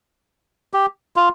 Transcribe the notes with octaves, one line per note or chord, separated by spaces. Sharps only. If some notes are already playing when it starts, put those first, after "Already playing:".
G4
F4